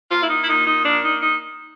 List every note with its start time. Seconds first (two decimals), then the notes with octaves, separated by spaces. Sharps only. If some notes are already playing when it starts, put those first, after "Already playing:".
0.11 A#3 F4
0.23 E4
0.29 D#4
0.43 E4
0.48 A#2 D#4
0.67 D#4
0.85 A#3 D4
1.04 D#4
1.22 D#4